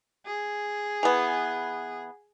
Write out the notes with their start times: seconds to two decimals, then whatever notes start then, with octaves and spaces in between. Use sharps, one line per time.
0.26 G#4
1.03 E3 B3